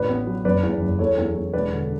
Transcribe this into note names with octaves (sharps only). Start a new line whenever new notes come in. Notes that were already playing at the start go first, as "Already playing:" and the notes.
Already playing: A1 B4 D5
B3
F#3
F#1 B4 D5
E2
F#1
E2 A4 C#5
E2
E2
E1 B4 D5
D3